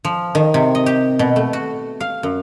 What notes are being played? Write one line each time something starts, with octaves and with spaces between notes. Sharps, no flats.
F3
D#3
C3
D#5
G4
B2
A3
F#4
F5
F#2